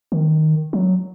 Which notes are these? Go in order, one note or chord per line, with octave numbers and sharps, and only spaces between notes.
D#3
F#3